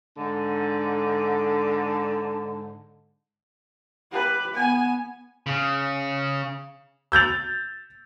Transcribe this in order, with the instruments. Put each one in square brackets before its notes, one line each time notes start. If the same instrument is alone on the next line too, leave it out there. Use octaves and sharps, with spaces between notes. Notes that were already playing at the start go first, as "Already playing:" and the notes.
[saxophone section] G#2 D3
[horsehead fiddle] G4 B4
B3 G#5
[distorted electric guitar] C#3
[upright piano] E6 G6 A6 F7